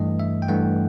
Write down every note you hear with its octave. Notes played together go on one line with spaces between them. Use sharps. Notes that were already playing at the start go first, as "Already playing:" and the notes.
Already playing: G2 E3 A3 D#5
E5
G5
G2 E3 A3 F#5